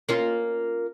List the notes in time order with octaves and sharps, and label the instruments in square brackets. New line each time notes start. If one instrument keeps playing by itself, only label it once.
[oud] A#3 C#4 F4